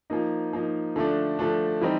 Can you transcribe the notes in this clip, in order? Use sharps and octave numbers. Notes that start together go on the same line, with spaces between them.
F3 A#3 D#4
F3 A#3 D#4
D3 F3 A3 D4
D3 F3 A3 D4
E3 G3 C4 D#4